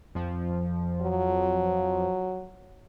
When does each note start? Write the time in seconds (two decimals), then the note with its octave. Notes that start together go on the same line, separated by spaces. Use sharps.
0.15 F2 F3
1.01 F#3